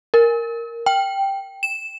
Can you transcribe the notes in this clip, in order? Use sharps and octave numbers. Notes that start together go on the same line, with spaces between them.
A#4
G5
E7